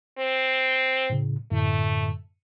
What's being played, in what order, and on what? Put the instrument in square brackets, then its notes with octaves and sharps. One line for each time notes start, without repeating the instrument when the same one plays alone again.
[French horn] C4
[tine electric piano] A2 C#3
[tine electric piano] F#2 A2 D3 [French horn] A3